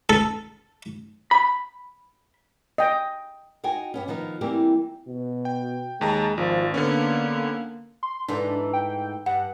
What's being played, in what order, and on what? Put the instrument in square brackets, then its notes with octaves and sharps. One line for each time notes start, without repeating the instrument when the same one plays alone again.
[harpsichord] A4
[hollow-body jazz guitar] B5
[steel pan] D#5 G5
[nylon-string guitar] D#4 F#4 D#5 G5 G#5
G2 B3 C#4
D#3 F3 B3 D#4
E3 G3 A#3 C4 G4
[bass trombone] B2
[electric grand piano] G5
[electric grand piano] D#2 A5 A#5 [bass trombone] G#3
[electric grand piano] G#1 [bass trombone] F3
[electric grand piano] D3 B3 C#4 [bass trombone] A#3
[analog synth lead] C6
[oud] G#2 E3 A3 [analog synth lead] D4
[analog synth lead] G5
[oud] G2 [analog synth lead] F#5